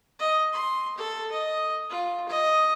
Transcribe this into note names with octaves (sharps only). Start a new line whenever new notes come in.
D#5
C6
A4
D#5
F4
D#5